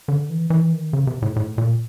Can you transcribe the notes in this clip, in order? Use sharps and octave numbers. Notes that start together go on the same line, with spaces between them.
D3
E3
E3
D#3
C#3
C3
A2
A2
A#2